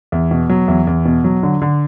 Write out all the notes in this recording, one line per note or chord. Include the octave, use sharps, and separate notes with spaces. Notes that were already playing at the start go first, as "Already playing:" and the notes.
E2
B2
F#3
E2
E2
B2
F#3
D3
D3